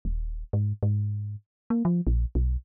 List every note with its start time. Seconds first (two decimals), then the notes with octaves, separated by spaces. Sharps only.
0.05 D#1
0.53 G#2
0.83 G#2
1.70 A#3
1.85 F3
2.07 A#1
2.35 B1